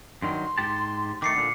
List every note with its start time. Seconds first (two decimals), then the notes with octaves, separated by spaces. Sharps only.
0.22 G2 D#3 F#3 C6
0.58 G#2 G4 A5
1.22 D#3 A3 D6 C7 C#7
1.35 A#2 D3